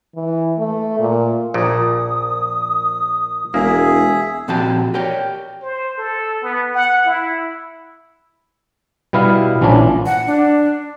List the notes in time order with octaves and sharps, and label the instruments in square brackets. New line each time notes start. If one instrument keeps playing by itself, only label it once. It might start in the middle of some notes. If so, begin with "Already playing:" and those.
[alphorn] E3
A3
A#2
[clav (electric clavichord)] A#1 A#2 [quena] D#6
[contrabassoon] E1 [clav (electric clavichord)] A#3 [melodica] G#4 E5
[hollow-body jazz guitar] A#2 F3 C4 F#4 G4 A5
G4 A#4 C#5 D5 G5
[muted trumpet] C5
A4
B3
F#5
E4
[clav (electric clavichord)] B2 G3 B3 E4 F5
A#1 E3 F3 C#4 D4
[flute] F#5
D4